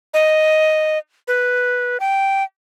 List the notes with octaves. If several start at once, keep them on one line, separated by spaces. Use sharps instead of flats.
D#5
B4
G5